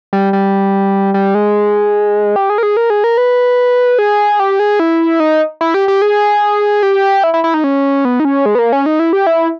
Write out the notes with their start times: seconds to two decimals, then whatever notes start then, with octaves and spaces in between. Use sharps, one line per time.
0.13 G3
0.33 G3
1.14 G3
1.34 G#3
2.36 G4
2.50 G#4
2.58 A#4
2.63 G#4
2.77 A#4
2.90 G#4
3.04 A#4
3.17 B4
3.99 G#4
4.40 G4
4.60 G#4
4.80 E4
5.20 D#4
5.61 E4
5.74 G4
5.88 G4
6.02 G#4
6.83 G4
7.24 E4
7.34 E4
7.44 E4
7.54 D#4
7.64 C#4
8.05 B3
8.20 D#4
8.25 C#4
8.46 G#3
8.55 B3
8.59 A#3
8.73 C#4
8.86 D#4
8.99 E4
9.13 G4
9.27 E4